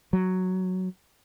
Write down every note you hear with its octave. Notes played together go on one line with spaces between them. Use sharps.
F#3